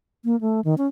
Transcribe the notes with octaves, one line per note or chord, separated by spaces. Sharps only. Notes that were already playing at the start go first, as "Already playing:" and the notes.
A#3
A3
D#3
C#4